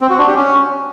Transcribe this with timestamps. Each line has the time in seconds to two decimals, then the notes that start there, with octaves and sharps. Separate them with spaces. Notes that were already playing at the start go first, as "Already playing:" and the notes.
0.01 C4
0.10 F#4
0.18 D4
0.27 G4
0.36 C#4